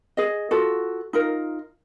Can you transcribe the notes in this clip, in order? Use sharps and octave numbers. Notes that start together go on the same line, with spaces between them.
G#4 D#5
F4 F#4 A4
D#4 F4 A#4